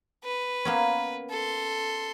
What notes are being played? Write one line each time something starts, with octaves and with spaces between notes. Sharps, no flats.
B4
A#3 B3 C#4
A4 C6